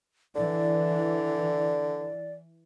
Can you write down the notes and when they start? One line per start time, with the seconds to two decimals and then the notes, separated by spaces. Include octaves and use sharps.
0.36 D3 E3 D5